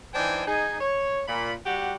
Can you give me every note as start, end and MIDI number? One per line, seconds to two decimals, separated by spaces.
0.14 0.45 52
0.14 0.45 62
0.14 0.45 63
0.14 0.45 72
0.14 0.45 79
0.14 0.45 80
0.47 0.78 63
0.47 0.78 68
0.47 0.78 80
0.81 1.23 73
1.28 1.53 46
1.28 1.53 83
1.66 1.96 55
1.66 1.96 66
1.66 1.96 67
1.66 1.96 78